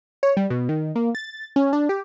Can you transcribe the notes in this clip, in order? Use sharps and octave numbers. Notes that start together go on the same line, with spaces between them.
C#5
G3
B2
D#3
A#3
A6
C#4
D4
G4